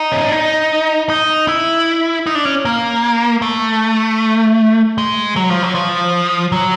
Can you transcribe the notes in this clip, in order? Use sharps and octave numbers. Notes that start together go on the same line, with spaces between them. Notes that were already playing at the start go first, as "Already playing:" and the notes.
Already playing: D#4
C#4
D4
D#4
D#4
E4
D#4
D4
C#4
A#3
A3
G#3
F#3
F3
F#3
F3
F#3